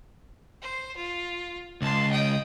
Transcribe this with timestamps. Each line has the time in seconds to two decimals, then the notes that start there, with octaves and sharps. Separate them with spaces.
0.62 C5
0.96 F4
1.82 C#2 A5 C6
2.11 D#5 G5